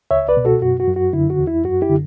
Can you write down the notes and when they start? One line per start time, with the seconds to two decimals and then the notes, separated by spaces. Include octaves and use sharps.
0.11 C#2 C#5 E5
0.28 B4 D5
0.37 B2
0.45 F#4 A4
0.62 F#2 F#4
0.80 F#4
0.87 F#2
0.96 F#4
1.13 D3 E4
1.30 F#4
1.39 E2
1.47 E4
1.64 F#2 F#4
1.82 E4 G4
1.90 D3